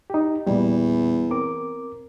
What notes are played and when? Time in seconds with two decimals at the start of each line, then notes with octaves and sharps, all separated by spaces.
0.10 D#4 G4
0.47 E2 A#2 G3
1.31 C4 A#4 D6